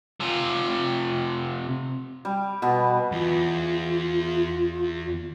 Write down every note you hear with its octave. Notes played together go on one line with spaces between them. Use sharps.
C3 F4
G3
B2 B3
E2 F4